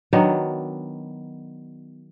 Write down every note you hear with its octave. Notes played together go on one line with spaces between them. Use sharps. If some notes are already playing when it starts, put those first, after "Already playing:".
D#3 F#3 B3 D4